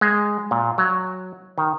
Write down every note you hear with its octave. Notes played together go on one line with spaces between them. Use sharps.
G#3
A#2
F#3
D#3